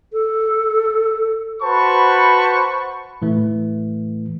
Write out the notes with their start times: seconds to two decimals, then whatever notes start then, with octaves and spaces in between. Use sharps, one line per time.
0.13 A4
1.62 F#4 B4 C5 A5 B5 C#6
3.22 A2 E3 A3